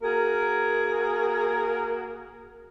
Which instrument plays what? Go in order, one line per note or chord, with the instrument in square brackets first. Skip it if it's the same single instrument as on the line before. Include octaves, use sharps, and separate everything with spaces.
[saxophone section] A#3 F#4 G#4 A#4